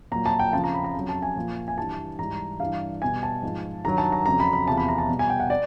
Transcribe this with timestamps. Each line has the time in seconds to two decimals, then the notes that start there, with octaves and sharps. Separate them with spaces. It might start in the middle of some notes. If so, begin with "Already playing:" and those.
0.12 A#2 F#3 A#5
0.26 A5
0.39 G5
0.53 F2 C#3 F3 A5
0.64 A#5
0.74 B5
0.84 A#5
0.94 F2 C#3 F#3
1.09 A5
1.22 G#5
1.36 A#2 F3
1.68 G#5
1.78 G2 E3 G3 A5
2.19 G#2 E3 G3 A#5
2.60 G2 E3 G3 F5
3.02 B2 G3 G#5
3.23 A5
3.43 G#2 F3
3.85 G2 D#3 F#3 A#5
3.98 A5
4.12 A#5
4.25 F2 C#3 F#3 A#5
4.40 B5
4.53 B5
4.67 E2 C3 F3 A5
4.77 B5
4.88 A#5
4.98 A5
5.09 B2 G3
5.19 G#5
5.30 G5
5.40 F#5
5.50 D5